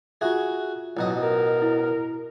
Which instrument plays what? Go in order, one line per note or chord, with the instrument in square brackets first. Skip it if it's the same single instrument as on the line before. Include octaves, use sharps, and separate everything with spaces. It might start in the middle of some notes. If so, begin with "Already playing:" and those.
[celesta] F4 E5 [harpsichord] F#4 G#4
[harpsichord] A1 B2 D#5 [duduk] F#3
[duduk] A#4
[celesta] E4